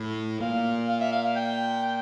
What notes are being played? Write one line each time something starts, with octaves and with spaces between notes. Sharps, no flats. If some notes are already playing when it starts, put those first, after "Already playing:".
Already playing: A2
A#2 F5
F5
E5
F5
G5